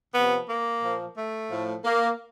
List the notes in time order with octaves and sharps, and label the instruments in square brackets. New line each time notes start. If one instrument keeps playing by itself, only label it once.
[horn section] C3 F3 B3
A#3
A#2 F3
A3
A2 F3
A#3